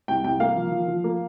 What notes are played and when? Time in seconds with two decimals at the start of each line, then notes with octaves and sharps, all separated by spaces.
0.08 C2 G5
0.24 C2 G5
0.40 A#3 F5
0.56 F3
0.72 F3
0.88 F3
1.04 A#3